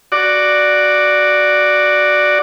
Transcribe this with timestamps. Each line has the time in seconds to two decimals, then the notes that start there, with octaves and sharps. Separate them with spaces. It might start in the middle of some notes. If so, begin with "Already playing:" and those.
0.12 F#4 D5